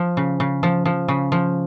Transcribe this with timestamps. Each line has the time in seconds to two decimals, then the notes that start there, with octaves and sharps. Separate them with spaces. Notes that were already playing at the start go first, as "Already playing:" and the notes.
Already playing: F3
0.17 C#3
0.40 C#3
0.63 F3
0.86 F3
1.08 C#3
1.32 F3